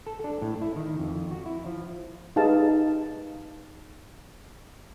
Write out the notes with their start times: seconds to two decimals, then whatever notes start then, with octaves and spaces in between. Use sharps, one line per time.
0.06 A4
0.24 D4
0.42 A2
0.62 E4
0.76 D#3
0.99 F2
1.31 F#4
1.46 E4
1.66 F3
2.36 D#4 G4 G#4 B4 F5 A5